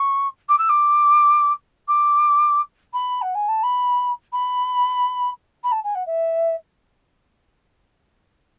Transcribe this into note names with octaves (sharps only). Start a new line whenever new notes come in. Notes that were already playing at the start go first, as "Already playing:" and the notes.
Already playing: C#6
D6
E6
D6
D6
B5
F#5
G#5
A5
B5
B5
B5
A5
G#5
F#5
E5